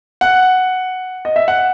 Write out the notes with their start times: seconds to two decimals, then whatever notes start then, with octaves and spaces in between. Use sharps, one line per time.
0.21 F#5
1.25 D#5
1.36 E5
1.48 F#5